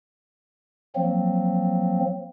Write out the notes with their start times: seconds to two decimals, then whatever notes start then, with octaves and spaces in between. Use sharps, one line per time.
0.95 F3 F#3 A#3 C4